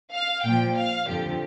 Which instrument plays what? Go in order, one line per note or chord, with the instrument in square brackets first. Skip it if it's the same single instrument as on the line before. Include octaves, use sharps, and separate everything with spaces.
[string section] F5
A#2 F3 G5
F5
F2 D3 F3 G4